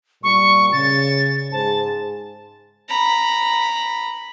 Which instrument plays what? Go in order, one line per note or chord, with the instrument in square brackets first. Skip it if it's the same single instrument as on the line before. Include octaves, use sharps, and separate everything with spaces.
[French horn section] A#2 G3 [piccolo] C#6
[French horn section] C#3 [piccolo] A6
[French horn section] G#2 G#4 C5 [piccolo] A5
[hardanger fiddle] A#5 B5